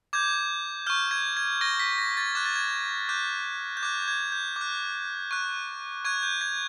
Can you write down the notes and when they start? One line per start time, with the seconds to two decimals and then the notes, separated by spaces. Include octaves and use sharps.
0.13 D6 G6 G#6
0.87 C#6 F6 G6
1.11 G#6
1.37 G#6
1.61 C#6 F6 A#6
1.80 B6
1.98 A#6
2.17 A6
2.35 D6 F#6 G#6
2.46 A6
2.56 G#6
3.09 D6 F#6 G6
3.77 G6
3.83 D6 F#6 G#6
4.02 G6
4.08 G#6
4.32 G6
4.56 D6
4.61 F#6
5.31 C#6 F#6
6.05 C#6 F#6 G#6
6.23 G6
6.41 G#6